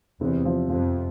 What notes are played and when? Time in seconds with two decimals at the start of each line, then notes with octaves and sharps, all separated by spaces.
0.21 E2 C3
0.45 F3
0.69 F2 F3